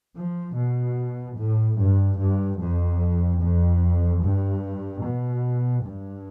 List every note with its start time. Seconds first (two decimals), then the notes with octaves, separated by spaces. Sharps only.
0.16 F3
0.56 B2
1.37 A2
1.78 G2
2.18 G2
2.59 F2
3.40 F2
4.22 G2
5.03 B2
5.84 G2